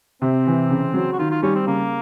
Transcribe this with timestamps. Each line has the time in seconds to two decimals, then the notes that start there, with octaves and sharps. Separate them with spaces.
0.22 C3 C4
0.47 E3
0.70 C#3
0.94 F#3
1.13 F#4
1.19 D#3 F4
1.31 F4
1.43 G3 C#4
1.55 C4
1.67 C#3 A#3